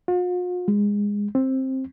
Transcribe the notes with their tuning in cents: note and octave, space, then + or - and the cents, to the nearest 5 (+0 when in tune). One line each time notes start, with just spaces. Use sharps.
F4 +45
G#3 -20
C4 +10